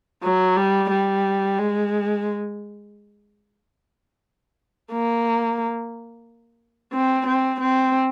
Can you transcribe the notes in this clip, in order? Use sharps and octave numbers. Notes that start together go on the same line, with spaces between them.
F#3
G3
G3
G#3
A#3
C4
C4
C4